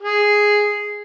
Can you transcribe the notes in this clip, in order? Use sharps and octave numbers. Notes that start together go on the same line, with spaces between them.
G#4